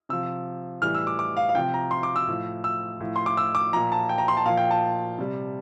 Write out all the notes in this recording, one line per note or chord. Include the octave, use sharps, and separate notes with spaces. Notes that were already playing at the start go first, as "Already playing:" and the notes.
C3 F3 E6
A2 E3 G3 F6
E6
D6
D6
F5
F5
C3 F3 G5
A#5
C6
D6
E6
A2 F3
E6
A2 F3
C6
D6
E6
D6
A#2 F3 A#5
A5
G5
A#5
C6
A5
A#2 F3 F5
G5
A5
C3 G3